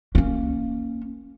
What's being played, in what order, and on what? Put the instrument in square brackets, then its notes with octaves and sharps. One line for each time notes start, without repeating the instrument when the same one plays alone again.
[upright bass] A#3 C#4